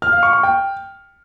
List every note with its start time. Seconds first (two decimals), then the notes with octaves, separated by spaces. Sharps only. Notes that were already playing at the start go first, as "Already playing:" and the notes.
0.02 F6
0.12 F5
0.23 C#6
0.33 C#6
0.43 G5